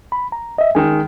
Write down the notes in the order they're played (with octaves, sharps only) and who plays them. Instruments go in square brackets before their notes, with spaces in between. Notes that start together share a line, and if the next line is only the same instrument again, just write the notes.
[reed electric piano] B5
A#5
D#5 E5
[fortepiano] D#3 G#3 [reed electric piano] G#5